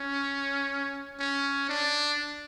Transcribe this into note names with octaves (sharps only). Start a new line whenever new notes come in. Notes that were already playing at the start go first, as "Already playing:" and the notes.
Already playing: C#4
C#4
D4